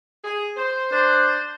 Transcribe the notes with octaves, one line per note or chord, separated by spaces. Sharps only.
G#4
C5
D4 C5